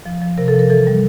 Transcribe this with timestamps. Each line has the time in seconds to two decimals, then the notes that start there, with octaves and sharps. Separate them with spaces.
0.06 F3
0.22 F3
0.38 C3 A#4
0.48 A4
0.54 F3
0.59 A#4
0.70 E3 A4
0.87 G3